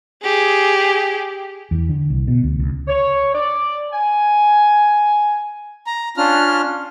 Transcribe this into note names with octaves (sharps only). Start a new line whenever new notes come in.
G4 G#4
E2
D3
C2
B2
D2
C#2
C#5
D5
G#5
A#5
C#4 D4 F4 F6